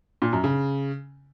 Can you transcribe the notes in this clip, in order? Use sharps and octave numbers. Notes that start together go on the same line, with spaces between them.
A#2
F#2
C#3